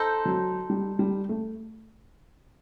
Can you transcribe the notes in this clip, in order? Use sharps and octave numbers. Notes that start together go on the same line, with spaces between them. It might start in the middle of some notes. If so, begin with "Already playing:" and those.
Already playing: D#4 A4 C5
F#3
G3
G3
A3